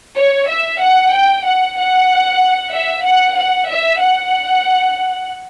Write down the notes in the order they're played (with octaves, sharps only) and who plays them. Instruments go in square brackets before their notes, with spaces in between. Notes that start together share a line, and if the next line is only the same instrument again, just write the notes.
[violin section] C#5
E5
F#5
G5
F#5
F#5
E5
F#5
F#5
E5
F#5